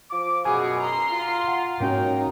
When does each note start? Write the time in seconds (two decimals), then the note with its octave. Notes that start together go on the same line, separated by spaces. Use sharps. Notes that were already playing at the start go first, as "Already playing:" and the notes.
0.11 F3 F4 D6
0.45 F#2 B2 F#4 G#4 G#5
0.81 A#5 C6
1.10 F4
1.48 F#5
1.80 G#2 A#3 C#4 D#4 F#4 C#5 G5